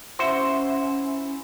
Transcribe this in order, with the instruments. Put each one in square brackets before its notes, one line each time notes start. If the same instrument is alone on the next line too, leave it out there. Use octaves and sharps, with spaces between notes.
[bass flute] C#4 [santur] E4 E5 [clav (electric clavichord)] F#4 C5 [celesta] C6